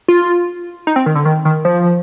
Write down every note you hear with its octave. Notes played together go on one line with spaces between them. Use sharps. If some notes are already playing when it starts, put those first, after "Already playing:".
F4
D#4
C4
D#3
D3
D#3
D#3
F3